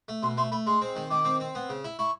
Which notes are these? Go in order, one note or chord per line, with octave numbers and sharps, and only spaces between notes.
A3
B2 C6
A3 C6
A3 B5
G#3 C6
C4
D#3
D#3 D6
C4
C4
B3
C#3
E4
E4 C#6